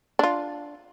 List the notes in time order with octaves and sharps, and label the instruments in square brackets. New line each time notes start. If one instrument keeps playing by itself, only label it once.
[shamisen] D4 F4